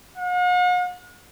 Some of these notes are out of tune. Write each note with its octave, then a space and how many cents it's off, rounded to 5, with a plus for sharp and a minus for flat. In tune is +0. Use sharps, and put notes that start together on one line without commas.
F#5 -45